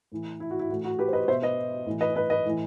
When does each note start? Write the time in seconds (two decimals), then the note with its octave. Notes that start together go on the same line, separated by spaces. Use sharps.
0.12 A2 E3
0.40 E4
0.51 F#4
0.59 E4
0.70 A2 E3 F#4
0.85 F#4
0.99 G4 B4
1.08 C5
1.13 B4 D#5
1.28 B2 C5 E5
1.42 B4 D#5
1.86 A2 E3
2.01 B4 D#5
2.15 B4 D#5
2.30 B4 D#5
2.45 A2 E3